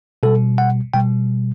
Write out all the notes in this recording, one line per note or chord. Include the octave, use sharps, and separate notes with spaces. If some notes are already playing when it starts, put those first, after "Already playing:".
B2 G3 A4
F#5
B2 G3 G5